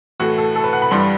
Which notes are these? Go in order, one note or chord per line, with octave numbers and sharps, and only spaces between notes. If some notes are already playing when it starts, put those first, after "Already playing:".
A2 E3 A3 F#4
A4
A4
B4
F#5
B5
G2 E3 G3 C6